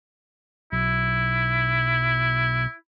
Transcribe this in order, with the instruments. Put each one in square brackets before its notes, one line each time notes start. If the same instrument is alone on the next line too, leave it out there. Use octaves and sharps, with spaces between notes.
[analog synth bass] B1 [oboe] E4